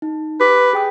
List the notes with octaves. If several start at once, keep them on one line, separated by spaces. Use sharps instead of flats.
D#4
G4 B4 D6
G#4 G5 D#6